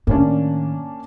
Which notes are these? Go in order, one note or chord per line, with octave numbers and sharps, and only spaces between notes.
A2 D#3 A#3 C#4 D4